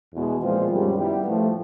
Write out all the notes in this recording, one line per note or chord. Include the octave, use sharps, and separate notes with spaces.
E2 B2 G#3
A#2 F3 G#3 C4 F4
F#2 D#3 G3
G3 B3 E4 G4
A2 F3 A3